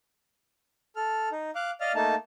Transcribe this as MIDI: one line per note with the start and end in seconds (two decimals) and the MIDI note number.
0.96 1.29 69
0.96 1.29 89
1.32 1.51 63
1.55 1.71 77
1.55 1.71 86
1.55 1.71 90
1.81 1.92 74
1.81 1.92 75
1.81 1.92 77
1.81 1.92 89
1.95 2.15 57
1.95 2.15 58
1.95 2.15 63
1.95 2.15 81